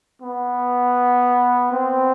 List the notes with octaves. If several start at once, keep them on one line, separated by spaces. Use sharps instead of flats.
B3
C4